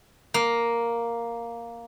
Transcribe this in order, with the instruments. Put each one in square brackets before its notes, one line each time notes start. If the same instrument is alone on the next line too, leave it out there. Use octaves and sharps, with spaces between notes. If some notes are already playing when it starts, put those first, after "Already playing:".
[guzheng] A#3